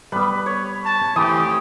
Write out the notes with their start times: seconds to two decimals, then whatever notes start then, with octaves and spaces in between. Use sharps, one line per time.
0.12 G3 B3 B4
0.46 C#5
0.84 A5
1.16 E3 A3 C4 G4 D#6